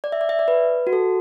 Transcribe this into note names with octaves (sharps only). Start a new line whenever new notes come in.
D5
E5
D5
E5
D5
B4
F#4
A4